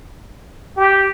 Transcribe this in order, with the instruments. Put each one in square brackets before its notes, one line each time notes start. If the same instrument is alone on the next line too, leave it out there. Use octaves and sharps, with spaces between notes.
[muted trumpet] G4